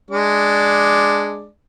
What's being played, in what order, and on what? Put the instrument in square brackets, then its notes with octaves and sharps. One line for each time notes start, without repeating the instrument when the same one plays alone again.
[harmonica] G#3 D4 D5